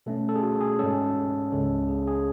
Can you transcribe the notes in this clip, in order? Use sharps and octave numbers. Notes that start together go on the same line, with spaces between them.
B2 A3 C#4 A4
A4
G#4
F#4
G#4
G#2 G#3 C#4 A4
C#2 C#3 G#3 C#4 A4
G#4
G#4